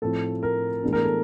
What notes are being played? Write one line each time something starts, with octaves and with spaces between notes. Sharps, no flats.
A2 F3 A3 C4 A4
A#4
A2 E3 G#3 B3 D4
A#4
A4